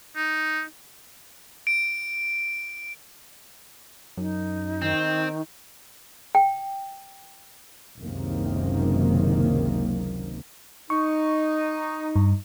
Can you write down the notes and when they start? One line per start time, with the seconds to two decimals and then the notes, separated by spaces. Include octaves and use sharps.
0.16 D#4
1.67 D7
4.17 F#2 D#4
4.82 D#3 C4
6.35 G5
8.01 F#1 C#2 F#2 C3 D#3 A#3
10.90 D#4 C#6
12.16 G2